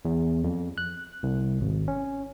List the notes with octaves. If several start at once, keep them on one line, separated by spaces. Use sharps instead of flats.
E2
F2
F#6
C2
G#1
C#4